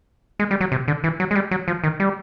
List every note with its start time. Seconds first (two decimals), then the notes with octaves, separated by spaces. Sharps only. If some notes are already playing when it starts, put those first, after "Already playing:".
0.39 G#3
0.51 G3
0.61 F#3
0.72 C3
0.88 D3
1.04 E3
1.20 F#3
1.31 G#3
1.35 G3
1.51 F#3
1.68 F3
1.84 D#3
2.00 G3